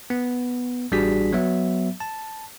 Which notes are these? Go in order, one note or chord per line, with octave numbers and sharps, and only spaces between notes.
B3
A1 G3 D4 F#4 G#4 B6
F#3 B3 E5
A5